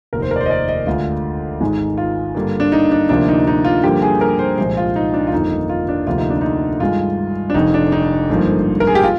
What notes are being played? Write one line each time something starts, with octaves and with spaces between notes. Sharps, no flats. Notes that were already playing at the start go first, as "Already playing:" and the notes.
F1 D#2 D#3 A#4
C5
A#4
D5
C5
D#5
D5
D#5
D2 D3 G#3 F4
G#1 G#2 D#3 G#3
F4
G2 D3 G3 A#3
D4
D#4
D4
D2 C3 F3 A#3 D4
D#4
D#4
F4
G2 D3 F3 A#3 G4
G#4
A#4
C5
C2 A#2 F3 G#3 C5
F4
D#4
D4
F4
G1 F2 D#3 A#3 D#4
D#4
F4
D4
D2 C3 F3 A#3 F4
D#4
D4
D#4
G2 D#3 G#3 F4
D4
F1 F2 D#3 D#4
D4
D#4
G#1 G2 D3 F3 A#3
A#4
G#4
G4
F4